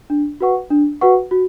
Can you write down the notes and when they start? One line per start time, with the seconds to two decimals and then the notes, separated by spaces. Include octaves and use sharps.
0.10 D4
0.41 F#4 B4 F#5 C#6
0.70 D4
1.01 F#4 B4 F#5 C#6
1.31 F#4